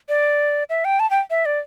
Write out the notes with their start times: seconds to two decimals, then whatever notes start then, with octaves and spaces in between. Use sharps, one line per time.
0.09 D5
0.70 E5
0.85 G5
1.00 A5
1.10 G5
1.30 E5
1.45 D5